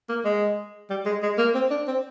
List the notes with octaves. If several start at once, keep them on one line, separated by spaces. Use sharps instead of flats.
A#3
G#3
G3
G#3
G#3
A#3
C4
D4
C4